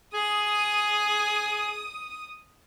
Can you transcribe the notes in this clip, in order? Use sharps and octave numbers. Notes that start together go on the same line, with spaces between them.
G#4 D#6